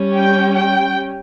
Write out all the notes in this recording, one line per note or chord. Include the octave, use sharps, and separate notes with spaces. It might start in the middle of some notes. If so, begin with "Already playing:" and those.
Already playing: G3 C#4
G5
G5